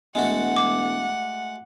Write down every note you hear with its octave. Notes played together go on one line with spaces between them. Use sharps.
E1 G#3 A3 F#4 F#5
D6